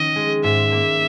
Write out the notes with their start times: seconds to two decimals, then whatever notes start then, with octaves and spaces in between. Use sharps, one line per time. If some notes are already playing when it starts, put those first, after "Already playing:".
Already playing: D#3 C#4 D#5
0.16 G#3
0.44 G#2 E5
0.72 A#3